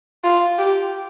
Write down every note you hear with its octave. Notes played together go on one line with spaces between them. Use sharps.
F4
G4